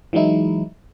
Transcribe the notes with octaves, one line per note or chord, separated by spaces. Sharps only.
E3 F#3 G#3 D#4 E4